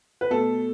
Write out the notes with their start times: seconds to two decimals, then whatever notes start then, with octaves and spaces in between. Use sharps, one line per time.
0.21 B4
0.30 B2 A3 A4